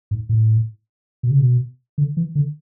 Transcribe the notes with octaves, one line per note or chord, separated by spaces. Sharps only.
G#2
A2
B2
C#3
B2
D3
E3
D3